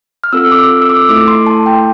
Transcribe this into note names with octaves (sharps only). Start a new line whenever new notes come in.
F6
C4 F4 A4 E6
D6
E6
D6
A3 E4 A4 D6
C6
A5
G5